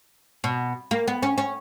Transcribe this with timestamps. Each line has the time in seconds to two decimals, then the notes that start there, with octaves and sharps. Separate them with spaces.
0.44 B2
0.91 A#3
1.07 B3
1.23 C#4
1.38 C#4